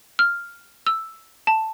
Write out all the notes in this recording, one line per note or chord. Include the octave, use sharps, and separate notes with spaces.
F6
E6
A5